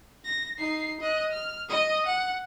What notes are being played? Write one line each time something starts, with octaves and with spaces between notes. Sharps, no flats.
A#6
D#4 C7
D#5 F#6
F6
D#5 D#6
F#5